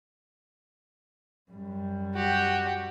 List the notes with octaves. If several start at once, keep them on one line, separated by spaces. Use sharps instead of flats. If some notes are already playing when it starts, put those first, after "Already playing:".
F#2 G3
F#4 G4